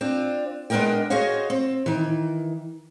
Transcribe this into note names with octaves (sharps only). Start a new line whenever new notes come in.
C4 D4 F4
G#3 B3 D4 A#4 D#5 G5
F#4 G#4 C5 C#5 D#5 F5
C4
D#3 E3